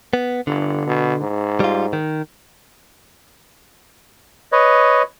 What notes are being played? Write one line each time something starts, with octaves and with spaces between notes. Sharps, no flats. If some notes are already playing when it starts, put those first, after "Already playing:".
B3
G1 D3
B2
G#2
G3 F4
D#3
B4 C#5 D#5